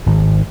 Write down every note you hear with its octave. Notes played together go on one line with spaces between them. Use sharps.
G#1